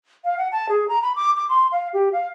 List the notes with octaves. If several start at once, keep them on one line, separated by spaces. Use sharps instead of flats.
F5
F#5
A5
G#4
A#5
B5
D6
D6
C6
F5
G4
F5